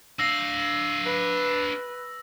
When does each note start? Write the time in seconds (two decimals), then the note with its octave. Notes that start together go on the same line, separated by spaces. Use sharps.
0.19 D4 F5 E6 A#6
1.05 B4